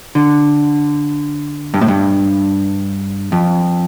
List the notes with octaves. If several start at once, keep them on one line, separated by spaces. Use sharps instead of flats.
D3
G2
A2
G2
F2